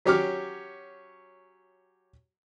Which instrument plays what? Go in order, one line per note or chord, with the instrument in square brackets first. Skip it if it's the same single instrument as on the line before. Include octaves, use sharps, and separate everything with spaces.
[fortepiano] F#3 C#4 G4 C#5 D6 F6